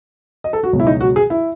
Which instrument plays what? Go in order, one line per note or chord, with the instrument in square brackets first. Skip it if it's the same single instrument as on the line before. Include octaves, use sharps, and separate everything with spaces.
[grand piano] D#5
A4
F#4
C#2 B2 F#3
E4
D#4
F#4
G#4
E4